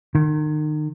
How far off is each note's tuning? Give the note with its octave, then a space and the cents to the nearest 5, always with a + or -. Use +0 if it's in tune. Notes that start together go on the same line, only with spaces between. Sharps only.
D#3 -35